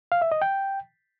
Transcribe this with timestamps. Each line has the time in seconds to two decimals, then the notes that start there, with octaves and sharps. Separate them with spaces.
0.12 F5
0.22 E5
0.32 D#5
0.42 G5